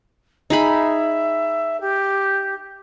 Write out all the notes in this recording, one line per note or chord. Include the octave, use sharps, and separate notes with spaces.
D#4 G#4 E5 B5
G4